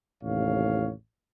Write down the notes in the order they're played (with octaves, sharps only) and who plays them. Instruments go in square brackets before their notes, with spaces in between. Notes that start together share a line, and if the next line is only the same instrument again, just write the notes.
[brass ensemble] A1 D#2 A2 C3 C#5 F5